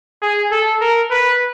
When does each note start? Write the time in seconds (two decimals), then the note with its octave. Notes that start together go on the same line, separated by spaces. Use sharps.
0.22 G#4
0.52 A4
0.81 A#4
1.11 B4